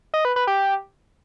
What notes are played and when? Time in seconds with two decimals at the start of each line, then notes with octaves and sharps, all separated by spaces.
0.14 D#5
0.25 B4
0.36 B4
0.47 G4